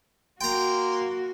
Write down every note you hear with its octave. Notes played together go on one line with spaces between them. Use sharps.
A#3 F#4 G5 A#5 C6